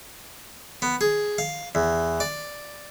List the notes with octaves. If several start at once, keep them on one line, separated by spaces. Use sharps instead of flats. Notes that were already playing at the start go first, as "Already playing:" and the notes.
B3
G#4
F5
E2
D5